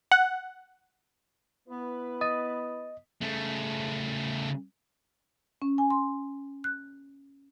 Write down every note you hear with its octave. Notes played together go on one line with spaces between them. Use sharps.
F#5
B3 E4 B4
D#5 D#6 A6 D#7
C#3 A3
C#4
G#5
C6
F#6